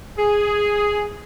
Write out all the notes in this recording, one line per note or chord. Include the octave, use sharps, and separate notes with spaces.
G#4